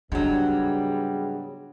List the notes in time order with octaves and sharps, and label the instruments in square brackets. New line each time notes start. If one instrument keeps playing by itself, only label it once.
[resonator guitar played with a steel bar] G#2 F#3 [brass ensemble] C#3 G3 B3 [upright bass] D4 [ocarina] G#4